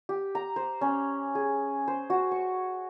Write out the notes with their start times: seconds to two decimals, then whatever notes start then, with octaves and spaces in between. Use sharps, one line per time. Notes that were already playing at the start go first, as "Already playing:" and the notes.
0.09 G4
0.35 A#5
0.56 C5
0.81 C#4
1.35 G#4
1.88 C5
2.10 F#4
2.31 C#6